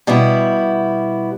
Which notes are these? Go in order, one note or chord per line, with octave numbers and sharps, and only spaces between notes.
B2 G3 B3 E4